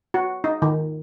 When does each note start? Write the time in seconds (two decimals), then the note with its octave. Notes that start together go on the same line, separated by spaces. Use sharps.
0.14 F#4
0.44 D#4
0.62 D#3